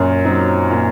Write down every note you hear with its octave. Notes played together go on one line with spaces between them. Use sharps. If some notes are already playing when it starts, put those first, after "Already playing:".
Already playing: F#2 A#2
F#3 C4 D#4
A#2